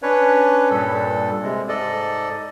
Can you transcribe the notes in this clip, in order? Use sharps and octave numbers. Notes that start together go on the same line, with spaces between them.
C#4 D4 B4 C#5
G2 A#2 G3 A4
C3 G#3
G#2 A4 D5 D#5